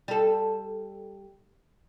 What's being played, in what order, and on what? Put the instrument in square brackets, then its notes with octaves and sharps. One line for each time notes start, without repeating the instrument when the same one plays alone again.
[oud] G3 A4